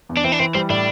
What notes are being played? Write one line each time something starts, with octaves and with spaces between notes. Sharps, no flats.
E2
D4
E3 C4
D4
E3 C4
G3 C4
A2 D4